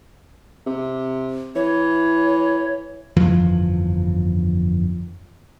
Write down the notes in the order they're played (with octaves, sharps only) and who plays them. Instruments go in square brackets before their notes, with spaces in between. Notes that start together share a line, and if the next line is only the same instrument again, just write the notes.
[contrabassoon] C3
[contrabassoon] E3 [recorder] C#5
[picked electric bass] G1 F2 E3 F3